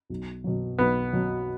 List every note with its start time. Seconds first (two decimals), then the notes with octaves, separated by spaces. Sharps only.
0.10 B1
0.44 B2 F#3
0.78 B1 B3
1.13 B2 F#3